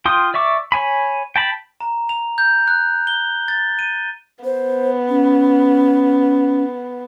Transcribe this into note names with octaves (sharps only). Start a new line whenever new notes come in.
F4 G5 C6 D#6
D5 E5 C#6 D6
C#5 G#5 B5
G5 A5 B5
A#5
F7
G6
F#6
G7
A6
D#7
B3 C5
C#4